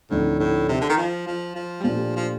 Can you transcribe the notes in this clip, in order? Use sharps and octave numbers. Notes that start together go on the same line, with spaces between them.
D2 A2 D3 F3 C4 D#4
A2
C3
D3
D#3
F3
F3
F3
G3
A#2 F3 A3 D4 G4
F3